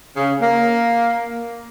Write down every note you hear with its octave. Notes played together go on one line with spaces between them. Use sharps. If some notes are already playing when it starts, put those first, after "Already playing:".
C#3
A#3